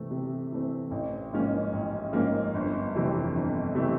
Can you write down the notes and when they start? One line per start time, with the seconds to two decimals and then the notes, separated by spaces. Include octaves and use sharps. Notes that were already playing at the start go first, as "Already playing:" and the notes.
Already playing: C3 E3 A3 C4
0.11 C3
0.52 E3 A3 C4
0.91 A1
1.33 G#2 F3 A#3 C#4
1.73 A1
2.13 G#2 F3 A#3 C#4
2.54 G1
2.94 F2 C3 E3 A3
3.35 G1
3.75 C3 E3 A3